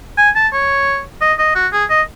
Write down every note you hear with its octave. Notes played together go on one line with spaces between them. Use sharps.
G#5
A5
C#5
D#5
D#5
F#4
G#4
D#5